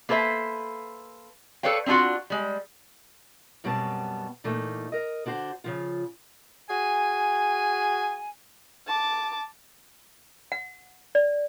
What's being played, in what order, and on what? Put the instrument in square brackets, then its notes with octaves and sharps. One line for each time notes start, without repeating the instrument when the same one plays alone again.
[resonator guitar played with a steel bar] A#3 A4 B4 C5 E5
A4 B4 C#5 D5 F5 G5
C4 D4 D#4 F4 F#4
G3 G#3
[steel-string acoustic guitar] F#2 B2 G3 B3 C4 A5
A#2 E3 A3 A#3 D#4
A#4 D#5
D3 D4 F#4 C5
C#3 F3 F4
[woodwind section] F#4 G#4 G#5
[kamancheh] A5 D6
[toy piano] F#5
D5